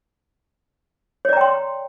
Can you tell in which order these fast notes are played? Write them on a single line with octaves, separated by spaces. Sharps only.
C#5 D5 A#5 G5 C6